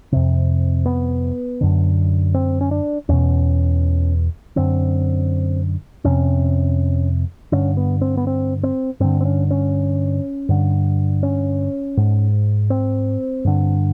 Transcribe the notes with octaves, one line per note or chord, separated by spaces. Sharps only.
F2 C3
B3
F#2 D3
C4
C#4
D4
E2 B2 C#4
F#2 D3 C4
F2 C3 C#4
G2 D3 C#4
B3
C4
B3
C4
C4
G2 D3 C4
C4
C#4
C#4
G2 D3
C#4
G#2
C4
G2 D3